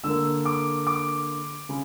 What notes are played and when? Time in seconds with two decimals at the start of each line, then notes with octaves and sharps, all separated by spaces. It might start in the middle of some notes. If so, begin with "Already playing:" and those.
0.04 D3 A#3 E6
0.45 D6
0.87 D6
1.69 C#3